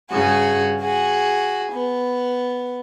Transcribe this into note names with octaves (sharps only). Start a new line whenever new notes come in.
G2 C#3 F#4 G#4
F#4 G#4
B3